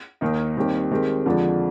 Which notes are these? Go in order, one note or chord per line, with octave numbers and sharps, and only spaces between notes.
D#2 D#3 A#3 D#4
D#2 D#3 G3 C4 G4
D#3 G#3 C4 G4
F2 D3 F3 G#3 D4